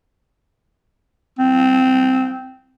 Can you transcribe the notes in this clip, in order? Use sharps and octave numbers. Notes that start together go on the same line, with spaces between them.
C4